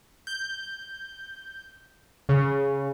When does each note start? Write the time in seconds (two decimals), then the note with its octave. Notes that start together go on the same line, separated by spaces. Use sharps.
0.27 G6
2.29 C#3